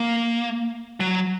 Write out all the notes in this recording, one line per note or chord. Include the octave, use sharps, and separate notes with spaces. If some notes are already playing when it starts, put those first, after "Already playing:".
Already playing: A#3
F#3